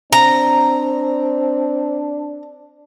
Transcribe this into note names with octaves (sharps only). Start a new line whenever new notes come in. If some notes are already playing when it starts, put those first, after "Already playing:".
C4 D4 A#5